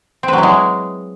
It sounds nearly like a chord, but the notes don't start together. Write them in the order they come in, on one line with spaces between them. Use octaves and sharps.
C4 B4 F#3 E4 G#3